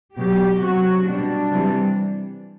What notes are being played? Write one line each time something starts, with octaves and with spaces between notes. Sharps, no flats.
B2 F#3 G4
C3 F#3 F#4
B2 G3 D4
C3 E3 G3